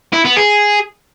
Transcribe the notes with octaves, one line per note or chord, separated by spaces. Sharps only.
E4
B3
G#4